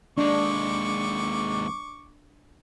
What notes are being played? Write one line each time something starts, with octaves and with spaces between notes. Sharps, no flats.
D#2 G#3 D4 C#6 D6